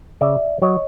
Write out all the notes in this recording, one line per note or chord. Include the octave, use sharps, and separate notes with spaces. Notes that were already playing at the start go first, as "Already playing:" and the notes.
C#3 D5 E5
F#3 C#5 D#5